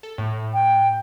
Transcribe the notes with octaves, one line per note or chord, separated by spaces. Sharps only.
A4
A2
G5